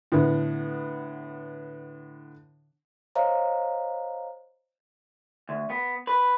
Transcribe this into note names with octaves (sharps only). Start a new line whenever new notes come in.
A2 D3 B3
C5 C#5 D#5 F5 A#5
D2
B3
B4